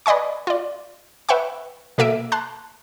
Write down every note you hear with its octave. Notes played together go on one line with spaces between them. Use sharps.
B4 D5 D#5 G#5 C#6
F4 D5
B4 E5 F#5 G5 C#6
B2 A#3 A4 E5 F5 D7
A5 C6 F#6